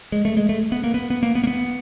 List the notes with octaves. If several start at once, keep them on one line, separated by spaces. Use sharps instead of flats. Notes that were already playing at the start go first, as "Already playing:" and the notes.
G#3
A3
G#3
A3
B3
A#3
B3
B3
A#3
B3
A#3
B3